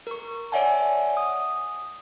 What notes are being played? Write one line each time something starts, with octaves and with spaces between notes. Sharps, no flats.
A#4 C#6
C#5 D5 E5 F#5 G#5 A5
D#6